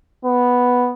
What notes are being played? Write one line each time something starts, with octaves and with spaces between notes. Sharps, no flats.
B3